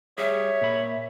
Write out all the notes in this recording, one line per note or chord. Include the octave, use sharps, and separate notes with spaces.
G3 G#4 C#5 E5
A#2 B5